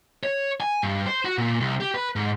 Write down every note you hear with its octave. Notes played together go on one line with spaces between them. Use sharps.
C#5
G#5
G2
C5
F#4
A#2
C2
G4
B4
G#2